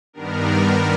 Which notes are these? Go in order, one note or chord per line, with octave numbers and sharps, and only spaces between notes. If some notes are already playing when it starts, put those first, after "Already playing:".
G2 D#3 G3 B3 D4 A#4